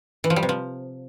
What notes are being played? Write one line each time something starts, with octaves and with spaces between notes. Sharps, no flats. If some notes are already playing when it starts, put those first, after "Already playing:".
E3
F3
G3
C3
F3